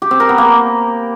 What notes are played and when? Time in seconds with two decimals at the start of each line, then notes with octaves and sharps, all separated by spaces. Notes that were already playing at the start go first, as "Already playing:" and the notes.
0.02 G4
0.11 C4
0.20 A#4
0.29 B3
0.38 A#3